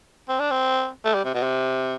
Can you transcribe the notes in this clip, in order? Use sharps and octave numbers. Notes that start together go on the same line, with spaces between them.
C4
D4
C4
A3
G3
C3
B2
C3